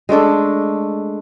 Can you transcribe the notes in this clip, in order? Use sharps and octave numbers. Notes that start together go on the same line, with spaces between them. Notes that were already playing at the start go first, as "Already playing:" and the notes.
G#3 A3 D4 A4